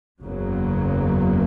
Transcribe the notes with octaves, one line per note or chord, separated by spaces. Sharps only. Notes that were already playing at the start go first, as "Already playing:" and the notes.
F#1 E2 C#3 F#3 A#3